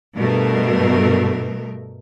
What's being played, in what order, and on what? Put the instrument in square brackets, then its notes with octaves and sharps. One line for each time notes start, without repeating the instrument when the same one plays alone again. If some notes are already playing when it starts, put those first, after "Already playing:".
[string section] G2 B2 A3 A#4